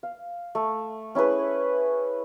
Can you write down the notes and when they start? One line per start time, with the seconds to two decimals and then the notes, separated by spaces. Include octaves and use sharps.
0.03 F5
0.55 A3
1.15 C#4 E4 G#4 B4